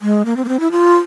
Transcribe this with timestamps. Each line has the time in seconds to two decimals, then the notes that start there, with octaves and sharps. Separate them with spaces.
0.02 G#3
0.25 A#3
0.36 C4
0.44 A#3
0.48 C4
0.60 E4
0.71 F4